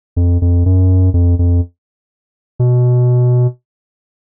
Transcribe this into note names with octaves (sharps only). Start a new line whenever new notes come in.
F2
F2
F#2
F2
F2
B2